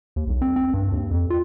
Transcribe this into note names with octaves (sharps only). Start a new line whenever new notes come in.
D#2
B1
C4
C4
G2
D#2
F2
F4